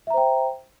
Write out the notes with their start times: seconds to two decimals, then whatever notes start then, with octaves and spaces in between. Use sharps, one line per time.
0.07 E5
0.10 A#5
0.14 C5
0.17 G5